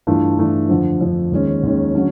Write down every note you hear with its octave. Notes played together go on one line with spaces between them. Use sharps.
G2 E3 A3 D4 F4
G2 E3 A3 D4 F4
F2 D3 F3
F2 D3 F3
D#2 D#3 G#3 C#4
D#2 D#3 G#3 C#4
D3 F#3 A3 C#4